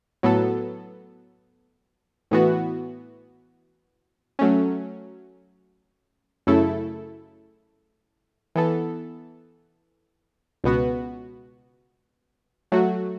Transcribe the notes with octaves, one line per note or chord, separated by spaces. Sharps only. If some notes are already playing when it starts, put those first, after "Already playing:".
A2 F#3 B3 A4
A2 E3 B3 F#4
F#3 A3 C#4
F#2 C#3 A3 E4 A4
E3 B3 A4
C#2 B2 B3 F#4
F#3 A3 F#4